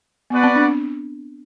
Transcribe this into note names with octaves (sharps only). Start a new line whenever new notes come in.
B3 F#4 B4 D5 F#5
C4
D4
C4